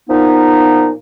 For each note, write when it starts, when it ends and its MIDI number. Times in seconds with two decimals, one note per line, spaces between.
0.09 0.92 46
0.09 0.92 53
0.09 0.92 59
0.09 0.92 63